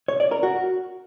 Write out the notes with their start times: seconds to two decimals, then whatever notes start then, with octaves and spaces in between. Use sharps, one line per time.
0.08 C#5
0.20 D5
0.31 A#4
0.43 F#4